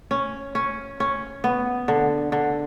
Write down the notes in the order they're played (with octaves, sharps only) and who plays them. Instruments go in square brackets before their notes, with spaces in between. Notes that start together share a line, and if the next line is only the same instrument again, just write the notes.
[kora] C#4
C#4
C#4
B3
D3
D3